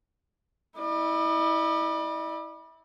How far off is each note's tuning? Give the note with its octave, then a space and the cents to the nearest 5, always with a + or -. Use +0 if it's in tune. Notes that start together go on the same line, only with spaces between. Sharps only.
E4 -25 D5 +40